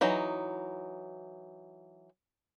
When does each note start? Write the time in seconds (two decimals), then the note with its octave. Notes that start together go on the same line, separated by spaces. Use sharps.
0.01 E3 F#3 D#4